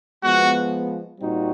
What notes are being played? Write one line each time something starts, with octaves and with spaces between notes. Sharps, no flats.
F3 G#3 B3 F#4
A#2 G3 C4 D#4 F#4